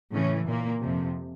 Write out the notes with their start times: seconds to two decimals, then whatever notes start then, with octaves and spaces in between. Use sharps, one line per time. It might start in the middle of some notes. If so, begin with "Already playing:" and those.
0.13 A2 C#3 E3 C#4
0.48 A#2 A#3
0.82 F2 C3 F3